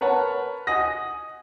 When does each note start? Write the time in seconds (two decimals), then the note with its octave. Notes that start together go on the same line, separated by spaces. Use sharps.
0.01 A#4 B4 C#5 F#5 A5
0.67 D#5 F#5 G#5 D#6 A#6